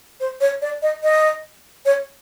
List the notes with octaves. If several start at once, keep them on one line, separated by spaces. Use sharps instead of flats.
C5
C#5
D5
D#5
D#5
C#5